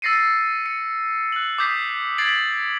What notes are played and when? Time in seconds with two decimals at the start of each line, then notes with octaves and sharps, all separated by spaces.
0.02 E6 A6 A#6 C7 C#7 D#7
0.66 C#7
1.32 F#6 F#7
1.58 D6 D#6 G6 B6 C7
2.18 G#6 A6 B6 C7 D7 F#7